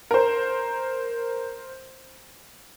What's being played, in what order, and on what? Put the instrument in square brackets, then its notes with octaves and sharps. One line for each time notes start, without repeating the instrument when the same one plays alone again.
[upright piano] A#4 C5